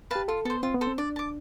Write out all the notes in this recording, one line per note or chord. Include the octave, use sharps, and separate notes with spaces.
G4 B4 F5 A5
F4 A4
B3 A4 C5
C4 F4
B3
A4 C5
C4
D4 D5
A5 D6